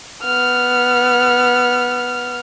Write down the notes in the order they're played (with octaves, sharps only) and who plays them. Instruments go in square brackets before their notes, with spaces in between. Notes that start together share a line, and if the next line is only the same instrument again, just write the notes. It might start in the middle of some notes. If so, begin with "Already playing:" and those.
[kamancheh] B3 F6